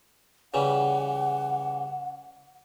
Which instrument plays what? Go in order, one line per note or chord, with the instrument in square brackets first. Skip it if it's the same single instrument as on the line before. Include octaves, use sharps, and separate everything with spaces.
[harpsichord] C#3 E3 G3 [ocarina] F#5